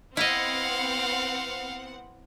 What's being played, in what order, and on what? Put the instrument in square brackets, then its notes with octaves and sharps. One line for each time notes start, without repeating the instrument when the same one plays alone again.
[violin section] B3 C4 F#5 [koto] E4 D#5 [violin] F5